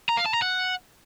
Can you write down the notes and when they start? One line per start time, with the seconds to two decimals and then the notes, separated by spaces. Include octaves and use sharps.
0.09 A#5
0.17 F5
0.26 A5
0.34 A#5
0.42 F#5